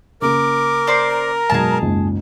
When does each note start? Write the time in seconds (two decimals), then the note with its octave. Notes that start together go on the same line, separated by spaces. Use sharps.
0.22 C#3 A#3 A#4 D6
0.87 C5 D5
1.10 A#5
1.50 G#2 B2 F#3 G#4 A5
1.82 F#1 C#2 G#2